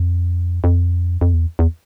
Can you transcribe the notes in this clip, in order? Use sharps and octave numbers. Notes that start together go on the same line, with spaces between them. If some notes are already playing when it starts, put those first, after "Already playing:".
Already playing: F2
F2
F2
E2
E2